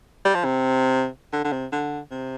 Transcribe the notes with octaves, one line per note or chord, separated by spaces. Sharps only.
G3
F3
C3
D3
D3
C3
D3
C3